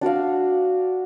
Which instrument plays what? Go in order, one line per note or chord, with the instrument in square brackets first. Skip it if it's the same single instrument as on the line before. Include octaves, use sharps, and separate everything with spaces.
[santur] D4 F#4 D5 F5